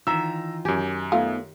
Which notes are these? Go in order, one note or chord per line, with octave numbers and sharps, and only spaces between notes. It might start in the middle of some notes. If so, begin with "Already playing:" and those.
D#3 E3 F4 E5 A#5 E6
F#2 G4 G#5
A3 B3 D#4 F4